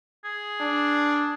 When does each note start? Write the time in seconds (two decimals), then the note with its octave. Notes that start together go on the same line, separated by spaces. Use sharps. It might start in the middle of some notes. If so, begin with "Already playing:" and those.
0.25 G#4
0.61 D4